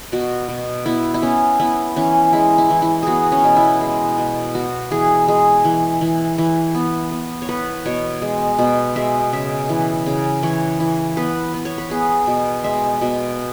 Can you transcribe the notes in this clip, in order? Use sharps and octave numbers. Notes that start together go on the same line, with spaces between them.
B2 F#4
B2
B3 E4
E4
B3 C#4
B3 E4
E3 C#4
G#3 E4
E4
E3
E4
B3 F#4 G#4
C#4
B2
E4
G#3
B2
B3 F#4
E3 G#4
G#3 G#4
E3
E3
E3
B3
B3
C#5
B3 B4
B2 C#5
G#3
B2
G#3 E5
C#3 E5
E3
C#3
E3 C#5
E3
B3 B4
B3
C#5
B4
B3 G#4
B2
G#3 E5
B2